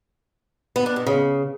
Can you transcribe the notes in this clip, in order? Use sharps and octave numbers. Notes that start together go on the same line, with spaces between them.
B3
D4
B2
C#3